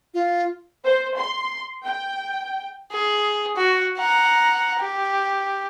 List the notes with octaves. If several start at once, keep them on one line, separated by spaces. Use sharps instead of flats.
F4
C5
C6
G5
G#4
F#4
F#5 A#5
G4